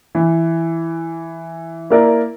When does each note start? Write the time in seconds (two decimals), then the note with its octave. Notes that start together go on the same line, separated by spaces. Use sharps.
0.15 E3
1.90 A#3 E4 A#4 D5